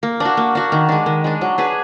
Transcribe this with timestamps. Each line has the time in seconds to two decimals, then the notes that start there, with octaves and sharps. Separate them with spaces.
0.03 A#3
0.20 D4 F#4
0.37 A#3
0.55 D4 F#4
0.72 D#3
0.89 G#3 D4
1.06 D#3
1.24 G#3 D4
1.41 F#3
1.58 D4 G#4 B4